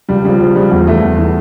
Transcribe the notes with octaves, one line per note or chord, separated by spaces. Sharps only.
C#2 G3
C#3 F3 G3
C#2 F3
C#3 F3 G3
E2 G3
E3 A3
E2
E3